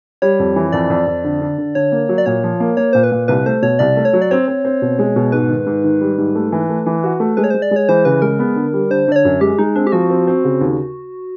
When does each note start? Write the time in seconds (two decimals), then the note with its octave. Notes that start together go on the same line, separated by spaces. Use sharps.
0.22 G3 C#5
0.39 F2
0.56 E3
0.72 F2 D5
0.90 F2
1.07 F2
1.24 D3
1.41 D3
1.58 D3
1.75 D3 C#5
1.92 A#3
2.09 F#3
2.18 D5
2.26 A#2 C#5
2.44 F3
2.60 A#3
2.77 A#3 C#5
2.93 A#2 C5
3.04 B4
3.12 A#2
3.28 C2 B4
3.46 A3 C5
3.62 B2 C#5
3.79 C2 D5
3.97 A3
4.05 C#5
4.13 F#3
4.22 D5
4.31 C4 C#5
4.48 C4
4.65 C4
4.82 B2
4.99 G#3
5.16 B2
5.32 G#2 B4
5.50 D#3
5.66 G#2
5.84 D#3
6.01 G3
6.18 G#2
6.35 A3
6.52 E3
6.69 A3
6.86 E3
7.04 F#4
7.20 A3
7.37 G#3 B4
7.44 C#5
7.50 G#3 C5
7.62 D5
7.71 G#3
7.76 C#5
7.89 E3 C5
8.05 C#3 B4
8.22 G#3 A#4
8.39 B3
8.56 D3
8.73 G3
8.90 D3 C5
9.08 D3 D5
9.16 C#5
9.25 F#2
9.41 G#3 G4
9.59 G#3 D#4
9.76 C4 D4
9.87 G4
9.92 F3 F#4
10.10 C4
10.27 C4
10.44 C#3
10.61 D#2